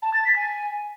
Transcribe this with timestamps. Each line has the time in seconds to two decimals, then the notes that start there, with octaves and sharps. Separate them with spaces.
0.02 A5
0.13 A6
0.25 B6
0.36 G#5